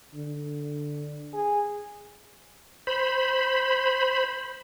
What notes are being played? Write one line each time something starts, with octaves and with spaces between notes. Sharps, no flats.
D3
G#4
C5 B5